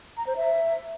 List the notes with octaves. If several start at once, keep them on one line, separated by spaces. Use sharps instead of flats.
A#5
C5
E5